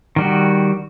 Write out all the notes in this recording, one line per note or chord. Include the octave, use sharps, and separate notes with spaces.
D#3 G3 F#4